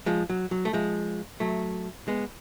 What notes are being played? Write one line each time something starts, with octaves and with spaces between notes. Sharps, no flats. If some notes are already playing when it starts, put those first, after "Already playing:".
F3 G#3
F#3
F#3
A3
F3 G#3
F#3 A3
G#3 B3